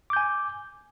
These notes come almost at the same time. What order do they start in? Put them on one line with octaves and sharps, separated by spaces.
D6 G6 G#5